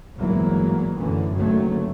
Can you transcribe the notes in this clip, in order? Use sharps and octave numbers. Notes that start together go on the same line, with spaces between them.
G1 E2 G#2 E3 F#3 A#3
F#2 A2 D3 E3
F#1 D3 D#3 F#3 A3